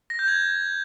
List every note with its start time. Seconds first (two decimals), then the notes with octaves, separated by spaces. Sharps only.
0.10 A#6
0.19 G6
0.28 G#6